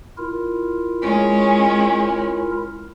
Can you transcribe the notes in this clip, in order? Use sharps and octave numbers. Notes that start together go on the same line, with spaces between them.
E4 F4 A#4
G#3 C#4